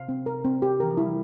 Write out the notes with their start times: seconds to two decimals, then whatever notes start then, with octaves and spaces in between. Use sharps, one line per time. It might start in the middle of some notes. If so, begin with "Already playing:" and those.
Already playing: C3 F5
0.09 C4
0.26 A#4
0.44 C4
0.62 G4
0.80 E3 A#4
0.90 F3
0.97 G3 E4